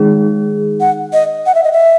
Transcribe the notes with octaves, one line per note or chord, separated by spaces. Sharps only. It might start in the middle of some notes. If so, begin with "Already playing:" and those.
Already playing: D#3 G#3 D#4 G#4
F#5
D#5
F#5
E5
D#5
E5